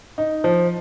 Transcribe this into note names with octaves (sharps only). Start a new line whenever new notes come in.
D#4
F3